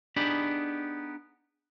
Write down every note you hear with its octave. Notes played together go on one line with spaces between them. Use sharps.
B3 D4 D#4 G4 G#4 B5